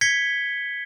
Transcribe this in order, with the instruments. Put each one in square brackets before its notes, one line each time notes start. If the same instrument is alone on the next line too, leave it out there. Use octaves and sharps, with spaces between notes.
[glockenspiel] G#6 B6 C#7 G7